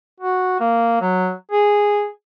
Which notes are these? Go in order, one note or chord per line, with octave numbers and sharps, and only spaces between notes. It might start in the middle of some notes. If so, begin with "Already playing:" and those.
F#4
A#3
F#3
G#4